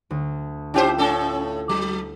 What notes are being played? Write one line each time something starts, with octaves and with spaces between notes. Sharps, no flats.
D2
C#4 E4 F4 G4 C5 G5
A2 C#4 A4
F#3